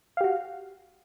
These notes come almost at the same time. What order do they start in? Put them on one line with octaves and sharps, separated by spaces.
F5 G4 F#4